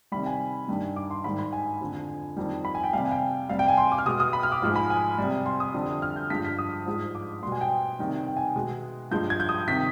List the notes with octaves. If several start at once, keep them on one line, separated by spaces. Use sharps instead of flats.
C3 D#3 G3 B5
G#5
G2 D#3 G3
D6
C6
G#2 D#3 G3 B5
B5
G#5
F2 D3 F3
F2 D#3 G3
B5
G#5
G5
C3 G3 F5
G#5
G5
C3 G3 F5
G5
G#5
C6
D6
F6
B2 G#3 D#6
D#6
B5
F6
D6
G#2 F3 G#3
G#5
B5
G#5
C3 G3
C6
D#6
F2 D3 G3
F6
G6
G2 F3 G#3 B6
B6
D#6
G#2 F3 G#3
D6
B2 G3 C6
G#5
G5
C3 D#3 G3
G5
G#5
B2 G#3
G2 F3 G#3 G6
G#6
G6
D#6
C3 D#3 B6